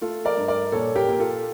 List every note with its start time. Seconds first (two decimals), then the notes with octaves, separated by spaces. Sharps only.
0.01 A3 F4 A4
0.25 A#4 D5
0.37 G2
0.48 A#4 D5
0.72 A#2 A4 C#5
0.96 G4 A#4
1.08 A#2
1.20 F4 A4